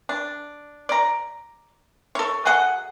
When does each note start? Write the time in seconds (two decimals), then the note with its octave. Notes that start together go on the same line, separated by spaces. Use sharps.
0.09 D4
0.89 D5 A#5
2.15 A4 C#5
2.45 F#3 G#4 A4 F#5